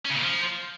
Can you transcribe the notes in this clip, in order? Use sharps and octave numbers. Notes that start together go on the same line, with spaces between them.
C#4
C#3
A#2
F3